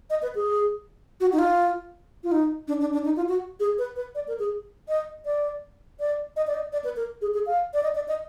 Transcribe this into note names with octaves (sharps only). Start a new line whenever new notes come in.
D#5
B4
G#4
F#4
D#4
F4
F4
D#4
D4
D4
D4
D#4
F4
F#4
G#4
B4
B4
D5
A#4
G#4
D#5
D5
D5
D#5
D5
D#5
D5
B4
A#4
G#4
G#4
F5
D5
D#5
D5
D#5